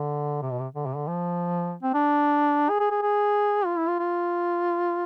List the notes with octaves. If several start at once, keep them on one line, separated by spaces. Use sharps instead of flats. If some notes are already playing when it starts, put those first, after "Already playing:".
Already playing: D3
C3
B2
C3
D3
C3
D3
F3
C4
D4
G#4
G#4
G#4
G#4
F4
E4
F4
F4